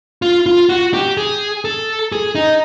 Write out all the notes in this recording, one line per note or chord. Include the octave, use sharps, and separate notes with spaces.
F4
F4
F#4
G4
G#4
A4
G#4
D#4